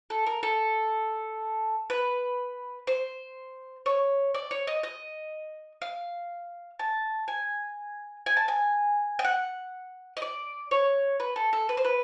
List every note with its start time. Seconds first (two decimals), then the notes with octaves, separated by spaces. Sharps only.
0.10 A4
0.26 A#4
0.43 A4
1.90 B4
2.87 C5
3.86 C#5
4.35 D5
4.51 C#5
4.67 D#5
4.83 D#5
5.82 F5
6.79 A5
7.28 G#5
8.26 G#5
8.37 A5
8.48 G#5
9.19 G5
9.24 F#5
10.17 D#5
10.22 D5
10.71 C#5
11.20 B4
11.36 A4
11.53 A4
11.69 B4
11.77 C5
11.85 B4